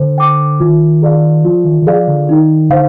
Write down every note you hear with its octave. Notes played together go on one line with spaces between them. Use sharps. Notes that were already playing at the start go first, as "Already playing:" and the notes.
Already playing: D3 C5
G5 D6
D#3 F4
G#4 D5 F5
F3 F4
D#3
D#3
F3 G#4 D5 F5
D3
D#3 D#4
D3 C5 F5